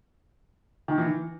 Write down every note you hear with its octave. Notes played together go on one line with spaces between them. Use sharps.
D#3
E3